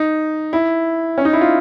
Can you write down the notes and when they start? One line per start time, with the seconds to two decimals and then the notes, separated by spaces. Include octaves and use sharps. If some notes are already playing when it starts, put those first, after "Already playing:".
Already playing: D#4
0.53 E4
1.18 C#4
1.25 D#4
1.33 E4
1.41 F4